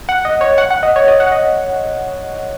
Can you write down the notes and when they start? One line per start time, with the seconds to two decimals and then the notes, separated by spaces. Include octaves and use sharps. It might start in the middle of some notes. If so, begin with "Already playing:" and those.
0.09 F#5
0.25 D#5
0.41 C#5
0.58 F#5
0.71 F#5
0.83 D#5
0.96 C#5
1.08 D#5
1.20 F#5
1.32 D#5